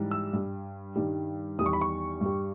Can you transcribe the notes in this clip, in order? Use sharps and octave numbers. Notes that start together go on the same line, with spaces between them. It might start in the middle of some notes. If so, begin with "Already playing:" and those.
Already playing: G#2 E3 G3
E6
G2 G3
G2 D#3 G3
E2 D#3 G3 D#6
C#6
B5
C#6
G2 G3